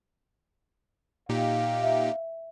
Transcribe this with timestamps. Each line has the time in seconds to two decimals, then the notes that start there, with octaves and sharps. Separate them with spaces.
1.29 A#2 D#4 G4 F5
1.83 E5